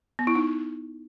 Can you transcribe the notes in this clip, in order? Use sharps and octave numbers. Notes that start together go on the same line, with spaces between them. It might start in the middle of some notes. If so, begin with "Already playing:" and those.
B3
E4
D#4